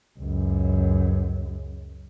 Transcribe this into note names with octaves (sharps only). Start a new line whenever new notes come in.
C#2 F#2